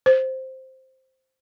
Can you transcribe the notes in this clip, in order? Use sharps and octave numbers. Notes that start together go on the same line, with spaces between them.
C5